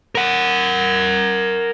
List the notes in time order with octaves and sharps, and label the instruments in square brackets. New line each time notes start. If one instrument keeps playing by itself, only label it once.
[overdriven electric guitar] A#4 F#5